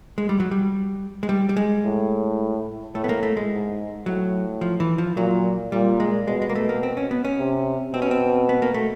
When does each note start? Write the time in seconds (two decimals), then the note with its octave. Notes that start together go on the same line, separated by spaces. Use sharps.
0.18 G#3
0.29 G3
0.40 F#3
0.51 G3
1.23 G#3
1.29 G3
1.49 G3
1.57 G#3
1.85 A2
2.95 A2 A3
3.04 B3
3.09 A#3
3.23 A3
3.37 G#3
3.51 G#2
4.06 A2 F#3
4.61 F3
4.80 E3
4.98 F3
5.17 A#2 F#3
5.72 A#2 G3
6.00 G#3
6.27 B2 G#3
6.42 G#3
6.49 A#3
6.55 A3
6.69 A#3
6.83 C4
6.97 C#4
7.11 B3
7.25 C#4
7.39 C3
7.93 B2 C4
8.02 C#4
8.11 C4
8.49 B3
8.62 A#3
8.74 A3